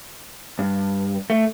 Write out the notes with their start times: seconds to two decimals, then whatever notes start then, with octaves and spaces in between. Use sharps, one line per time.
0.59 G2
1.30 A3